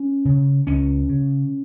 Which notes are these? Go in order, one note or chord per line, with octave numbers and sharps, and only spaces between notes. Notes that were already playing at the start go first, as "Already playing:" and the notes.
Already playing: C#4
C#3
C#2 C#4
C#3